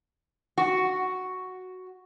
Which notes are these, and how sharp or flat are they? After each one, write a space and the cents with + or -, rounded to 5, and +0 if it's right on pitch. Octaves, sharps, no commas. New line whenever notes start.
F#4 +0